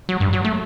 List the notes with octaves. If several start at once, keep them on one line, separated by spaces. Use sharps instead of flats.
F#3
G2
F#3
A3